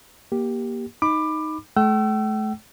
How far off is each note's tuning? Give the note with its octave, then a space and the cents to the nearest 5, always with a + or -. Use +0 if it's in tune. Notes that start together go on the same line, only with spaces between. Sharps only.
A#3 +20 G4 +0
D#4 +0 B5 +10 D6 +20
A3 -35 G5 -40 E6 +20